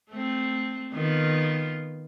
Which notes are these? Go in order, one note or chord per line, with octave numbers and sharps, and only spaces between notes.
A3 C4
D#3 B3 F4